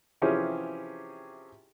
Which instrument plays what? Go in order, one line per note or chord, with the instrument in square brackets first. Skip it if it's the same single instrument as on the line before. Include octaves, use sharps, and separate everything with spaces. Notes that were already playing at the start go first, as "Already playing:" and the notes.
[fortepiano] C3 E3 F3 C#4 G4 G#4